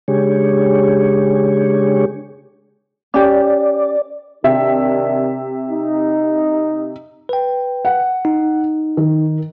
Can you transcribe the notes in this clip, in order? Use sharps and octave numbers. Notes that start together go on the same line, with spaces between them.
C#3 G#3 D4 G4 G#4 C#5
C#4 G4 D5
C3 D#3 D4 E5
D#4
B4 G5
F#5
D#4
D#3